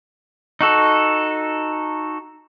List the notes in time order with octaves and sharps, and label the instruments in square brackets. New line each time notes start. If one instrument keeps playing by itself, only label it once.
[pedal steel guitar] D#4 F#4 A4